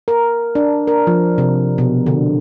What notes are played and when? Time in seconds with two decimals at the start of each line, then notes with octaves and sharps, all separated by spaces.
0.08 A#4
0.55 D4
0.87 A#4
1.07 F3
1.38 C3
1.78 B2
2.06 D3